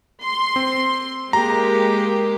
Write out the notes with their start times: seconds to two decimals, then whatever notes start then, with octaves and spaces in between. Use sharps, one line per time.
0.24 C6
0.56 C4
1.33 G#3 A#3 G4 A#5